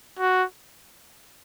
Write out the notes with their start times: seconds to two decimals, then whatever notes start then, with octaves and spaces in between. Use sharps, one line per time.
0.19 F#4